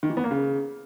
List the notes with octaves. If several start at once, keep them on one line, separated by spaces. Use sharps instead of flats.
D#3
E3
B3
A#3
C#3